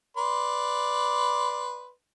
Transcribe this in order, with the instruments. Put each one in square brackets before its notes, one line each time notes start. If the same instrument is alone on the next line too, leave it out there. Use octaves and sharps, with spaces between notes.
[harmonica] B4 D5 C6